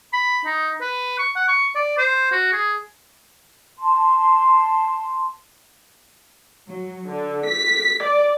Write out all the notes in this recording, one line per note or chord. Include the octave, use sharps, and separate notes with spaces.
B5
D#4
B4
C#6
F#5
C#6
D5
C5
F#4
G#4
A5 C6
F#3
D3
B6
D5